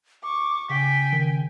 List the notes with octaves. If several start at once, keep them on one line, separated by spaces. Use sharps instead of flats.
C#6 D6
C#3 G5 G#5 B6
D#3